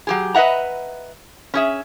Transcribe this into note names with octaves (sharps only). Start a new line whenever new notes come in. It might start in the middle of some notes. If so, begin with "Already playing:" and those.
F#3 G4 G#4
B4 D#5 E5 F#5 A#5
C#4 G#4 E5